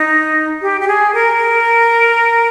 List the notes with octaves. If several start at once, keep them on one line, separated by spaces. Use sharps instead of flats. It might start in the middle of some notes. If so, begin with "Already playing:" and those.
Already playing: D#4
G4
G4
G#4
A#4